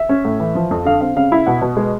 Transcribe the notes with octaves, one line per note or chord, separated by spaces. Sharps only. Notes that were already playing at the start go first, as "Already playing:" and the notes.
Already playing: E5
C#4
A2
E3
F3
F2
D3 F5
C4 F5
C#3 F5
E4
B2 F#5
B2
G#3